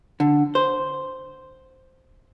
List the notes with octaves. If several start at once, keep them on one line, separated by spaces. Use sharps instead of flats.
D3
C5